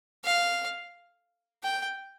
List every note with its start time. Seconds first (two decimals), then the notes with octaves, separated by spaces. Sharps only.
0.24 F5
1.63 G5